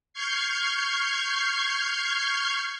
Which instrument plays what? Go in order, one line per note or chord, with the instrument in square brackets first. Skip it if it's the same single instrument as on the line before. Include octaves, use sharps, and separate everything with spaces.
[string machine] C#6 F6 G6 G#6 C7